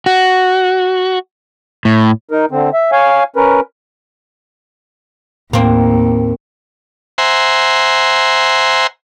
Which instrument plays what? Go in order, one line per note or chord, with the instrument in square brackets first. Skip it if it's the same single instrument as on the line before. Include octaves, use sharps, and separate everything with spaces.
[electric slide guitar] F#4
A2
[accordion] D#4 A#4
D3 C4
E5
C#5 F5 G#5
C#4 A#4 B4
[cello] D#2 [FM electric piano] A2 [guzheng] A#3 C4
[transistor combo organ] C5 E5 F#5 G#5 A#5 C6